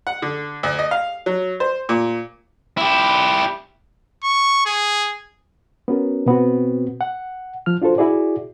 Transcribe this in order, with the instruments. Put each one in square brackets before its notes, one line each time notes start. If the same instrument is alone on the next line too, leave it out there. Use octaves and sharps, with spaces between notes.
[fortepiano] F#5
D3
D2
D#5
F5
F#3
C5
A#2
[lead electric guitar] E4 G4
[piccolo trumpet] C#6
G#4
[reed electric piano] B3 C#4 F#4 A#4
B2 B3 C4 F#4
F#5
F3 F6
D4 F4 F#4 A4 C5
E4 F#4 G#4 D5